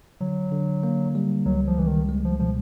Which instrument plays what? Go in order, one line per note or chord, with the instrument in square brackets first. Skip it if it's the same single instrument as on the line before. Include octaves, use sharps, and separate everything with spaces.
[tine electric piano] D3 [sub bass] F#3
[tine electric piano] D3
A#3
G3
[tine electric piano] C#2 [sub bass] F#3
[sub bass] F3
[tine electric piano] C#2 [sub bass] E3
[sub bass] D#3
[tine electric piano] G#3
[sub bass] F3
[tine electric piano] B2 [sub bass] F3